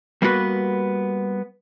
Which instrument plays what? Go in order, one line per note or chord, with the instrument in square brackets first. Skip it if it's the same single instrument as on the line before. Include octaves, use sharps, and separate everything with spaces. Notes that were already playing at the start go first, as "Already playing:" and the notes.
[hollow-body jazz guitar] G3 A#3 B3 F#4 B4